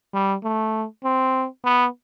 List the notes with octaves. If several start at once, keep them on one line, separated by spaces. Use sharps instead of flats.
G3
A3
C4
B3